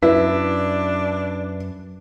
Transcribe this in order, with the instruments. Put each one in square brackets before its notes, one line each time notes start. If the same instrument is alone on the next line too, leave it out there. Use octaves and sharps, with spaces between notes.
[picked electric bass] F#2 [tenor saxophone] D4 [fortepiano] E4 [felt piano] B4